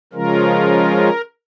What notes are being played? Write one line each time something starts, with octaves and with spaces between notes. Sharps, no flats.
C#3 F3 G#3 C#4 F4 A#4